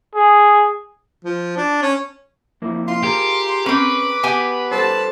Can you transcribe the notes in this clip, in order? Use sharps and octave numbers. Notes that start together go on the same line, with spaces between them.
G#4
F3
D4
C#4
F2 A#3 E4
F4 C6
G4 G#4 A#4
C4 C#4 B4 D6
B3 G4 G#5
G3 A4 C5 A5